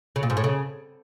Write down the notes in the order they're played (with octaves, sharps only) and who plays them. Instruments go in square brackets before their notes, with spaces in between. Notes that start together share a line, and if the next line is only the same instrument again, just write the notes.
[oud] C#3
A#2
G#2
A2
C#3